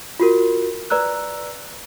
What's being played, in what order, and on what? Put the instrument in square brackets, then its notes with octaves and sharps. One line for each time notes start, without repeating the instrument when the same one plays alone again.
[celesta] F4 F#4 A#4
B4 D5 A#5 E6 F#6